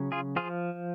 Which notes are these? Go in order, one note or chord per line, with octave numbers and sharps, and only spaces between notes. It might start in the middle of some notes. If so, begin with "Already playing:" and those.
Already playing: C#3 F#3 C#4
F4 G#4
F3 F4 G#4